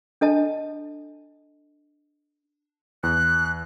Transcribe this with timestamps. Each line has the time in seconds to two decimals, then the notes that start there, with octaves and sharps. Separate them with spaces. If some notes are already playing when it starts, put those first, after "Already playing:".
0.21 D4 A4 D#5 A5
3.03 E2 F#6